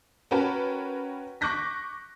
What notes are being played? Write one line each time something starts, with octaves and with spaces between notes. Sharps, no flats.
C#4 F#4 A#4 B4 G5 A5
C#6 D6 F#6 G6 A#6 B6